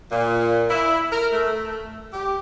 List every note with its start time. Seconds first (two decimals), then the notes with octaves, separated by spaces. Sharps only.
0.11 A#2
0.70 E4
1.12 A#4
1.32 A3
2.13 G4